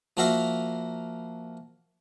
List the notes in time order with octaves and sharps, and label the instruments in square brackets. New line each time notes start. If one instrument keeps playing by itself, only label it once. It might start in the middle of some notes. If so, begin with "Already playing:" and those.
[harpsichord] F3 A#3 F#4 A#4 E5 F5